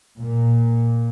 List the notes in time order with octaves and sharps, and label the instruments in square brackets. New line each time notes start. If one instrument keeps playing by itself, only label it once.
[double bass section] A#2